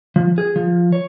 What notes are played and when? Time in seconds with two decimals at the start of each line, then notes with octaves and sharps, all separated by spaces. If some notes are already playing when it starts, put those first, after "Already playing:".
0.16 F3
0.38 G#4
0.56 F3
0.92 C#5